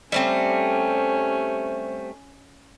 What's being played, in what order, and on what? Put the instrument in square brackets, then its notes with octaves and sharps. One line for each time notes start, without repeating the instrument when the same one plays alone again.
[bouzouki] G3 A3 C4 [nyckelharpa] C#4 [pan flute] C5